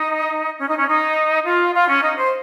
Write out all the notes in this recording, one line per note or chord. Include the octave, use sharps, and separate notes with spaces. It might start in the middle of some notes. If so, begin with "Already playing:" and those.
Already playing: D#4
C#4
D#4
C#4
D#4
F4
F4
C#4
D#4
C5